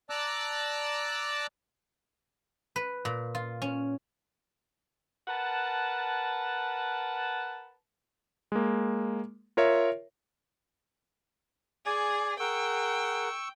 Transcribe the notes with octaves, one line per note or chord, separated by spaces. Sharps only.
D5 A5 A#5 D6 E6 F#6
B4
A#2
F4
C#4
A#4 B4 F#5 A5
G#3 A#3
F4 A#4 C#5 E5
G#4 D5 G#5
G#4 A#4 F#5 G5 C#6 E6